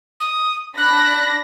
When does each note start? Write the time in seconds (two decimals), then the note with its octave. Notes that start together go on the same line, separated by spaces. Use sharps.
0.20 D#6
0.77 D4 B5 F#6 A#6